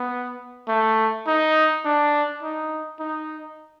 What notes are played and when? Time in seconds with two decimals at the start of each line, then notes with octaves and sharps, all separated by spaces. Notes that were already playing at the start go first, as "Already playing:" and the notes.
Already playing: B3
0.68 A3
1.27 D#4
1.85 D4
2.42 D#4
3.00 D#4